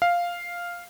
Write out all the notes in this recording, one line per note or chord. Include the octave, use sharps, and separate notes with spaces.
F5